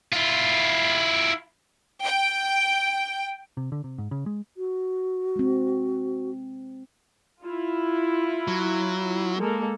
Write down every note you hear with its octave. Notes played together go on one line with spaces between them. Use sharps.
E4 F4
G5
C3
D3
C3
G#2
C#3
G#3
F#4
G#3 C4
E4 F4
F#3
G#3 A#3 A4